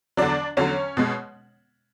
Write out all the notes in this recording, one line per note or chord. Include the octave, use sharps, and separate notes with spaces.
E2 D3 F#3 D4 D5
E2 D3 F#3 C#4 C#5
B2 G#3